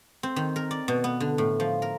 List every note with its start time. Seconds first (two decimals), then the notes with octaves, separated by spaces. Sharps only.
0.23 C4
0.36 D#3
0.56 A#4
0.71 D5
0.88 B2
1.04 B3
1.20 D3
1.38 A2
1.60 F3
1.82 A#4